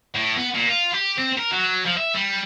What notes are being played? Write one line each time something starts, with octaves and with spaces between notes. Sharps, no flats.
A2
B3
A#2
F4
G4
C4
A#4
F#3
F3
E5
G3